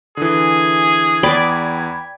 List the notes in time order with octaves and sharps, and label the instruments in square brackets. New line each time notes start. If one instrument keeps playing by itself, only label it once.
[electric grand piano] D3 E3 [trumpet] G#4
[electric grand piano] E2 [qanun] D5 [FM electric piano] G5 B5 G#6